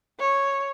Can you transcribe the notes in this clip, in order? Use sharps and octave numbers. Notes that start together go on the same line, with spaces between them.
C#5